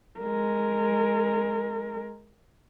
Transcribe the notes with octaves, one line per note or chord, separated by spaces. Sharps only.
G#3 A#4